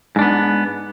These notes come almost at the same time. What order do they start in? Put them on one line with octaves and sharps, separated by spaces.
G#2 D4 B3